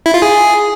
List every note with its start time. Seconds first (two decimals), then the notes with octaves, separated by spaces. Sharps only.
0.06 E4
0.14 F4
0.22 G#4